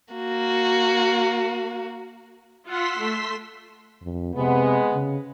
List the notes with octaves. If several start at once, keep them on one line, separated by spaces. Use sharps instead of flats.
A#3 F#4
F4 F#5 C6 E6 B6
A3
F2
C3 G#3 B3
C#3